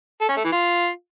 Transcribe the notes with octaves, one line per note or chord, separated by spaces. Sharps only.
A4
C#4
A3
E3
F4